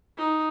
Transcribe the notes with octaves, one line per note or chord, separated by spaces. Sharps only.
D#4